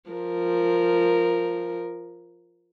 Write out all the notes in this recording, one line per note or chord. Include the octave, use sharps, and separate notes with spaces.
F3 A#4